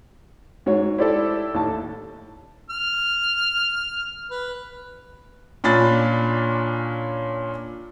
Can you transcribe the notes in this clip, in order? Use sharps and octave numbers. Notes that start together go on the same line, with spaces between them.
G#2 F#4 C#5
E4 G4 A4 C5 D5
D#2 A2 A5
F6
B4
A#2 C#4 D4 F4 B5 A6